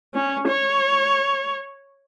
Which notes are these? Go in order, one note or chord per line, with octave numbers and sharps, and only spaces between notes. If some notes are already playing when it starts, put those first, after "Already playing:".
C#4
C#5